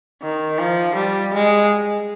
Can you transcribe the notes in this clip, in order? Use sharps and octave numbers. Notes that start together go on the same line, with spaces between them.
D#3
F3
G3
G#3